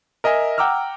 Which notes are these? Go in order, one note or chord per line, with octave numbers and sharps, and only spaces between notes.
A#4 D#5 E5 G#5 A#5
F#5 G5 A#5 D6 E6 F6